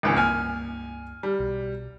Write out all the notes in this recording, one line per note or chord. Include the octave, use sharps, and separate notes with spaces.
G#1 C#2 G#2 E3 D#4
C#2 G2 A#3 G#5 F6
G3
B1 B2